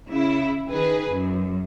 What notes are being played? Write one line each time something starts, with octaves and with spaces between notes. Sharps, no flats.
C#3 E4
D#3 G#4 B4
F#2